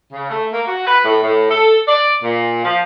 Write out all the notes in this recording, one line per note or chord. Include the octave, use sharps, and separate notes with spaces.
C#3
A3
A#3
F#4
B4
A2
A2
A4
D5
A#2
F3